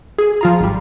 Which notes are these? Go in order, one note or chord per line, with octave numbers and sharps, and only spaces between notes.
G#4
F3 F4 A#5
G#1 G3